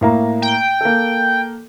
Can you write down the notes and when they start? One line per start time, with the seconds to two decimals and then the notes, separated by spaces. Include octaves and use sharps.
0.01 A2 A#3 A#5
0.42 G5
0.81 A#3 A4